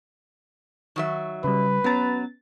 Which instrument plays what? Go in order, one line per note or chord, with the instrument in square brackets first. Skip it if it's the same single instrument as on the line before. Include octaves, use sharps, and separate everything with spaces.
[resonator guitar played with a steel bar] D#3 F#3 E5
[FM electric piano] C#3 G3 [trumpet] B4
[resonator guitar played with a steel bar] F#3 A#5 [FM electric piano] B3 C#4 A6